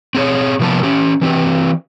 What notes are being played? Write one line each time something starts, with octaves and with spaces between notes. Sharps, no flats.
C4 G#4 C#5
C3 F3 A#3 B3 A5
C#4 G4
E3 C4 G4